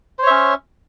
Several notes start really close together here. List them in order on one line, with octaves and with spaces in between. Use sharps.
C5 C#5 E5 C#4